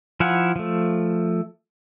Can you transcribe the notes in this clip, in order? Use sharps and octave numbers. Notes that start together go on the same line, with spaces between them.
F3 E4 F5 F#5 G#5
F3 A3